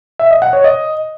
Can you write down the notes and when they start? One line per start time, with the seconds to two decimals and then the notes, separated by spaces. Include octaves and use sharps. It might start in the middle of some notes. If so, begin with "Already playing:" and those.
0.19 E5
0.31 D#5
0.42 F#5
0.53 C#5
0.64 D#5